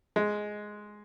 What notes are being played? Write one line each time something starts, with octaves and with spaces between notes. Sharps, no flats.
G#3